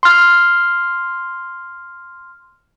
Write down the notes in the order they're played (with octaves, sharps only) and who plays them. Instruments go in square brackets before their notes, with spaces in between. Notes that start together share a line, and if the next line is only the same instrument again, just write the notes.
[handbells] C6 F6